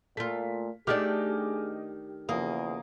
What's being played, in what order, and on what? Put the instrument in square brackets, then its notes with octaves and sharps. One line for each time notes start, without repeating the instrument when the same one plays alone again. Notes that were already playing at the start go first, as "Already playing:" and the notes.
[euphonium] A#2 [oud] A3 F4 [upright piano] B6
[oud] D#3 A3 D4 [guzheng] G4 [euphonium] G#4 [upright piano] D#5 D6 F6
[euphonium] E2 [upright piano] C#3 F3 D#6 [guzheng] A#3